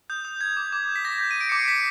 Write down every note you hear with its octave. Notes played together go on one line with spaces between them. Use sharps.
D#6 G6
D#6
G6 G#6
D6
D6
G6
B6
D6 A#6
G6
D#7
G6 D7
D6 C#7
C7
D6 B6